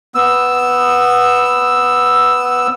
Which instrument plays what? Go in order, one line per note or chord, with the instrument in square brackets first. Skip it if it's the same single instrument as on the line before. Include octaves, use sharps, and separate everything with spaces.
[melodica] B3 E6